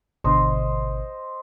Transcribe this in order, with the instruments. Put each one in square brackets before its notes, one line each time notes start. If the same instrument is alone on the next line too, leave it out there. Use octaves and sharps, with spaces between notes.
[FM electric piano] G#1 B2 D3 [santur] C5 D#5 C6